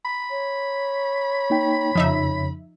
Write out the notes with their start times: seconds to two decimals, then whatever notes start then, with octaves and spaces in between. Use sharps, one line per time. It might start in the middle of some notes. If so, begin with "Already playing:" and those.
0.05 B5
0.30 C#5
1.50 A#3 D#4 G5
1.95 F2 C#3 F3 D#4 E5